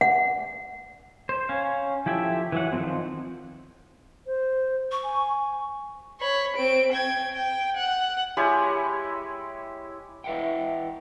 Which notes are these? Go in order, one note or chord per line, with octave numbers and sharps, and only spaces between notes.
F#5
C5
C#4 F5
F3 E4 G4 A4 E5
E3 F#3 F#5
D#3 F3 G#3 A3 C4
C5
C#6
G#5
C#5 B5
C4 D7
G5 G#6
G5
F#5
G#3 E4 G4 C#5
E4 B4 E5 F#5 G5